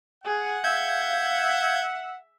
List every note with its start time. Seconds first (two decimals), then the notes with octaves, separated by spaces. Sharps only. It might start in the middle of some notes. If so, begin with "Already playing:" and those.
0.24 G#4 F#5
0.64 E5 F5 G6 G#6